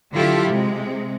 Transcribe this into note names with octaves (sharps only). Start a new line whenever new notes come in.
D3 F#3 E4 F4 G4 A4
C3 G#3